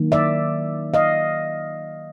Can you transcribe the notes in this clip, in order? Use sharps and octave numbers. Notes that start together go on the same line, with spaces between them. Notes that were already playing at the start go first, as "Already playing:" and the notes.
Already playing: D#3 F#3 A#3
D5 E5
D#5 F5